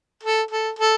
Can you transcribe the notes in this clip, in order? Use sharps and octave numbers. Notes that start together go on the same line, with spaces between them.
A4
A4
A4